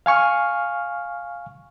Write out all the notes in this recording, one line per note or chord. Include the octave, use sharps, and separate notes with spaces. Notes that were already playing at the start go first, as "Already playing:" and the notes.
F5 G#5 C#6 F6